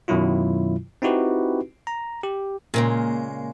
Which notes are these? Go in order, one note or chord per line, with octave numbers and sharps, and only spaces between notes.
F#2 B2 D#3 F#3 E4 F4
C4 D#4 E4 F#4 G4 B4
A#5
G4
A#2 C#3 G#3 A#3